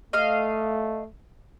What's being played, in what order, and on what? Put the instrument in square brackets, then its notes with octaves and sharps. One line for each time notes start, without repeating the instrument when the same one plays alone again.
[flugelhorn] A3 [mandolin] D#5 F5